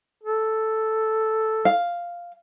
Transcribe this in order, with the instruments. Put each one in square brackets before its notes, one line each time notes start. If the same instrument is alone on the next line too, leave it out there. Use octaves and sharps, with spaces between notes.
[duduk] A4
[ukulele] F5